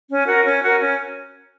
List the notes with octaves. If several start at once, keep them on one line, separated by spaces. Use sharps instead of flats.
C#4
F#4 A#4
C#4
F#4 A#4
C#4